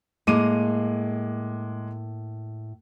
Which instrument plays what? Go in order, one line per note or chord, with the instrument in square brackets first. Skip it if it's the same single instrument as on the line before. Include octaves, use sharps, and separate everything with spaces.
[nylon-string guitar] A2 A#3 [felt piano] G#3 D6 D#7